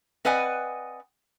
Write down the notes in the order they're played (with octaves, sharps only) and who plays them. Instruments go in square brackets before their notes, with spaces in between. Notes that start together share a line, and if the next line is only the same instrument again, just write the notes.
[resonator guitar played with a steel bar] C4 B4 D5 D#5 F#5 G#5